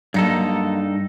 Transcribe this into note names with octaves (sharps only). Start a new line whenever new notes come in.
G2 F#3 G#3 A#3 D#4 A4